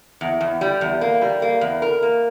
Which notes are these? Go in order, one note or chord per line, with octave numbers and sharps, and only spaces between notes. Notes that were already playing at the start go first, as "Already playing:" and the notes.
E2
E2
G3
E2
A#3
G3
A#3
E2
A#4
A#3